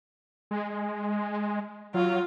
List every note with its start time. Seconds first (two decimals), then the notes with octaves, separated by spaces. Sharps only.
0.51 G#3
1.94 F#3 F4